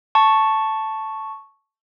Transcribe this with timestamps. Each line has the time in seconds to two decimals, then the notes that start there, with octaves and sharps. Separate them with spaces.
0.15 A5 C#6